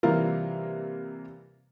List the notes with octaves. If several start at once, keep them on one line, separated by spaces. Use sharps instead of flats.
C3 E3 G3 A#3 F4 A#4